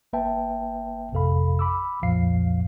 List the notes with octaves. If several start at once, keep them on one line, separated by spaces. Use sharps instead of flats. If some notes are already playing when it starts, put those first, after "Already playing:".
G1 A#3 B4 E5 G5 A5
A1 F2 C3 A4 F5 B5
B5 D6 E6
B1 F2 A#2 F3 F5 C7